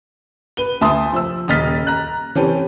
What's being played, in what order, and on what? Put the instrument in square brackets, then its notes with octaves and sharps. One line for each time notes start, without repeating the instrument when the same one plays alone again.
[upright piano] B4 G7
D2 E5 A5 C6 D#6
F3 E6
D#1 C#3 D#5 F6 A6 B6
A#5 F#6
E3 C4 C#4 G4 A4 B4